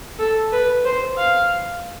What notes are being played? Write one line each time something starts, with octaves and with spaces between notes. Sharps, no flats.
A4
B4
C5
F5